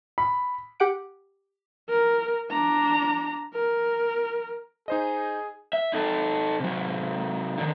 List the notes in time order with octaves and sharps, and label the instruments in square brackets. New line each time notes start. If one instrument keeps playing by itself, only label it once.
[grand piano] B5
[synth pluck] G4 F#5 D7
[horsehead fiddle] A#4
D4 A#5
A#4
[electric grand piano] D#4 C5 D#5 [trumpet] G#4
[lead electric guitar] E5
D#4 A4
C3 F#3
D3 D#3